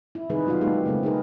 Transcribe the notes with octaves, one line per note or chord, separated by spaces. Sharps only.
E4
C3 D#3 G3 D#4 G#4 B4
B2 F#3 F4 F#4 F5
G#3 A#3 B3 D#4 G4 A4
C#3 G#3 A3 C4
D#4 G#4 A#4 B4